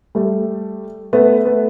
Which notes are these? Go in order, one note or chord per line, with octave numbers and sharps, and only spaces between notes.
G3 A3
A3 B3
A3 B3